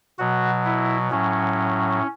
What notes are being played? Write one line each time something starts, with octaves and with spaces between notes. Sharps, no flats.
B2 F#3 F#4
E4
A2 F#3 C#4